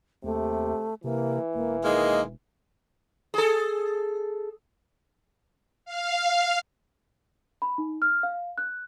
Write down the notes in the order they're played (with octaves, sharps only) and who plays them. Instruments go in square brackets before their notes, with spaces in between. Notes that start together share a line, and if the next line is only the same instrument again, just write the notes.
[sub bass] D#2 [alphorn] C3 [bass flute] A3
[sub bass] C3 [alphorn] E3 [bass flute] A#3
[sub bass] E1 [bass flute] A#3
[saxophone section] D#3 G#3 A#3 [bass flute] D#5
[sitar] G#4 A4
[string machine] F5
[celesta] B5
D#4
F6
F5
F#6